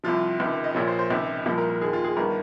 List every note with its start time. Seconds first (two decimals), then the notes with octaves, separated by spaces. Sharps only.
0.04 C2 C3 F3 F4
0.39 C#2 C3 D#3 F4
0.64 D#5
0.74 A#1 A#2 F3 C#5
0.87 C5
0.99 C5
1.10 C#2 C3 D#3
1.46 C2 A#2 F3
1.58 A#4
1.70 A#4
1.81 D#2 D#3 G#4
1.93 F4
2.04 G#4
2.16 G1 G2 D#3 A#4